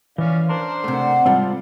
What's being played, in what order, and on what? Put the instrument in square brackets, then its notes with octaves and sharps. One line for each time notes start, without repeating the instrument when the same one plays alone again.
[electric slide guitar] E3 [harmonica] C#4 D5 F5
[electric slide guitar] D4 A#4 [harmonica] C5 C6
[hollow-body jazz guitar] C3 A3 [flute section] D5 F#5
[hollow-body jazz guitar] G#2 C3 G3 [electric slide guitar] C4 F4 A4